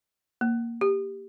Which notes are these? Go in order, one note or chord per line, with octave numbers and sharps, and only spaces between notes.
A#3
G4